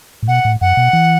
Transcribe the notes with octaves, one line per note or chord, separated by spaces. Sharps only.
A2
B2 F#5
A2
F#2 F#5
B2
E3